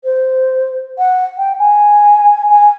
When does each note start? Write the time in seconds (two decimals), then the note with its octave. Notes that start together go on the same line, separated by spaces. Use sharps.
0.04 C5
0.98 F#5
1.38 G5
1.59 G#5
2.48 G#5